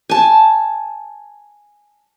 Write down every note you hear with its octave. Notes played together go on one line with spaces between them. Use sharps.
G#5 A5